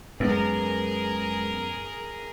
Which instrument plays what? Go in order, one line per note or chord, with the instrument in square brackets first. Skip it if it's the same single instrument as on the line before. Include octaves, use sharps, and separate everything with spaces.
[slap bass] F#2 [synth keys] G#3 B3 B4 [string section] G#4 A#4